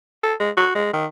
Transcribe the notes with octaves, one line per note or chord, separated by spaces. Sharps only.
A4
G#3
F#4
G#3
D#3